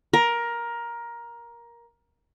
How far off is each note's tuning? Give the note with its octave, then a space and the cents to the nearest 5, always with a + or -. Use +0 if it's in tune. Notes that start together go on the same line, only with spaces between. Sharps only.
A#4 +15